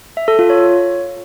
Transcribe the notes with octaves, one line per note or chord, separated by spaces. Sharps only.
E5
A4
F4
C#5